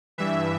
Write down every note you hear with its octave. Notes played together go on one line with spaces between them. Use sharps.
G2 E3 E5